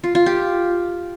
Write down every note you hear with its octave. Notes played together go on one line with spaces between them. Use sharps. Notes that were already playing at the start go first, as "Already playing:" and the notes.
F4
F4
G4